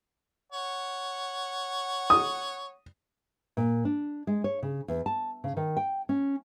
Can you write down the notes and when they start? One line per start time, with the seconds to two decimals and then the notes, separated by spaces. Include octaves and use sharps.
0.52 C#5 F#5
2.10 D#6
3.57 A#2
3.85 D4
4.27 G#3
4.44 C#5
4.63 C#3
4.88 E2
5.06 A5
5.44 C#3
5.57 D#3
5.77 G5
6.09 C#4